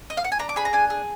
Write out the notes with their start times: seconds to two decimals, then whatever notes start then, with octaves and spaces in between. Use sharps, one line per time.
0.10 D#5
0.17 F5
0.24 F#5
0.32 G#5
0.39 D4 A#5
0.49 D6
0.56 G#4 B5
0.65 A#5
0.73 D4 G#5
0.90 G#4